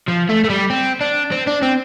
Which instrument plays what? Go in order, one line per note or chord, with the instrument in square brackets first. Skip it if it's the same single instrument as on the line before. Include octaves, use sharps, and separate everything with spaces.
[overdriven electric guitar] F3
A3
A3
G3
C4
D4
C4
D4
C4